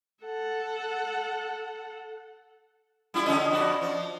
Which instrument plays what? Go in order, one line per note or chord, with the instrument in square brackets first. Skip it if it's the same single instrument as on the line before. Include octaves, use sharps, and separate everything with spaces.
[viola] A4 F#5
[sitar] G3 E4 F4
D3 C#4 D#5
F2 F#4 D5
F3